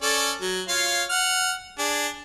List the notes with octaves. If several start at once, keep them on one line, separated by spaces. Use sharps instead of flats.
C#4 A4 D5
F#3
F4 C#5 F5
F#5 F6
D4 G#4